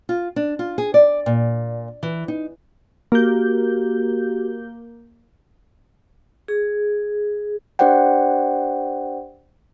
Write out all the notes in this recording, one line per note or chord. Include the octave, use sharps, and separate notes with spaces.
F4
D4
F4
G#4
D5
A#2
E3
D#4
A#3 F#4 G4 G6
G#4
D4 G4 C5 D5 F#5 G5